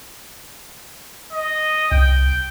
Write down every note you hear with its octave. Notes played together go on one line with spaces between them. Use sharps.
D#5
C2 G5